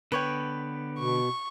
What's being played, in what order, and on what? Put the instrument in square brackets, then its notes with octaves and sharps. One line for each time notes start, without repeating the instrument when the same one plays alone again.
[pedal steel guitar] D3 B3 [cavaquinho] B4 C#5 G5
[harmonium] B2 [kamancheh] C#6